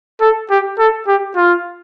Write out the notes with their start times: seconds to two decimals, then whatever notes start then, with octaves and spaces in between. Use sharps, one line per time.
0.21 A4
0.51 G4
0.79 A4
1.07 G4
1.36 F4